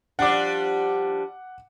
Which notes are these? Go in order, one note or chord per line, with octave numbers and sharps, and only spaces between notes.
F3 G3 D4 F#5 D6